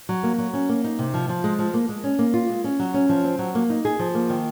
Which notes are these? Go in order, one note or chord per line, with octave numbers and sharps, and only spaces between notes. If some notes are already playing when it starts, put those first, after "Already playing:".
F#3
A#3
F#3
C#4
A#3
D#4
C3
F3
F3
G#3
F3
A#3
G#3
C#4
A#3
F4
G#3
C#4
F#3
C#4
F3
C4
F#3
A#3
D#4
G#4
F3
A#3
D#3